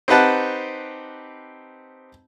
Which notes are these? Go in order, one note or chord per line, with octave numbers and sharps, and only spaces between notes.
C4 D#4 G4 B4 F#5 A5